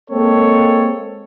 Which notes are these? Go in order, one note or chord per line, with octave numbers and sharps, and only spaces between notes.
G#3 A#3 C4 A4 C#5